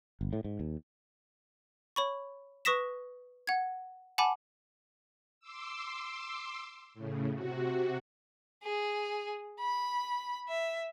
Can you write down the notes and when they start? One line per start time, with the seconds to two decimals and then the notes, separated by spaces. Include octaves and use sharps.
0.21 G1
0.33 A2
0.44 G#2
0.60 D#2
1.96 C#5 B5 C#6
2.65 B4 C#6 D#6 A#6 B6 E7
3.47 F#5 G#6
4.18 F#5 G#5 A5 B5 D6
5.40 C6 D6 E6
6.94 A2 C#3
7.34 C3 F#4
8.63 G#4
9.60 B5
10.48 E5